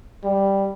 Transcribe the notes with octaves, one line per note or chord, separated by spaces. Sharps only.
G3